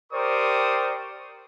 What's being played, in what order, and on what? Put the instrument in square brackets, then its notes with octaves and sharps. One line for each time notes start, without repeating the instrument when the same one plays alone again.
[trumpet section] G4 A#4 C5 D5 C#6 D#6